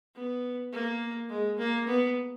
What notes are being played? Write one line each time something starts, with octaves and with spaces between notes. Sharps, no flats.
B3
A#3
G#3
A#3
B3